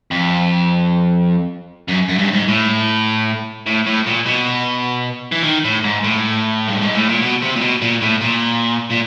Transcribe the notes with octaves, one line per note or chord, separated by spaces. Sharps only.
F2
F#2
F#2
G2
G#2
A2
A2
A2
A#2
B2
E3
D#3
A2
G#2
A2
G2
G#2
A2
A#2
B2
C3
A#2
B2
A#2
A2
A#2
A#2